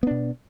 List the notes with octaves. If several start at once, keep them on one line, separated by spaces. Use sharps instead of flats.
B2 B3 D4